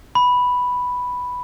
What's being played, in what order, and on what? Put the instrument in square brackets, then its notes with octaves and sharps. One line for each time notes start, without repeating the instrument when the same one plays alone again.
[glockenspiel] B5